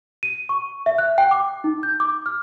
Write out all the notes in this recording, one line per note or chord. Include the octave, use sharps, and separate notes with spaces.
D#7
C#6
E5
F#6
G5
D6
D#4
G6
D6
F6